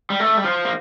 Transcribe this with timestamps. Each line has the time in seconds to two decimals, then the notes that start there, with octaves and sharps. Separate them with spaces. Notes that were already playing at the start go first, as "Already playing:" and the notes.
0.10 G3
0.20 A3
0.37 G3
0.45 F3
0.65 A#3